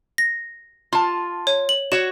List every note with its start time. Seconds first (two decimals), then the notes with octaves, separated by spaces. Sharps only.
0.18 A#6
0.93 F4 A5
1.47 C#5
1.69 F#7
1.92 F#4 C#5 E7